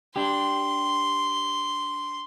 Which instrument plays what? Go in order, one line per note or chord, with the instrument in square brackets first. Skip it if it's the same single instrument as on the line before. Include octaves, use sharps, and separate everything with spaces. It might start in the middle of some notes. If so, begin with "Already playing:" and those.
[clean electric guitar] D4 G4 [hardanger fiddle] C6